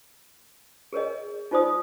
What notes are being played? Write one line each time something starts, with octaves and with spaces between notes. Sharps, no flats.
G#4 A#4 C#5 D#5
D#4 F4 C5 D5 D#6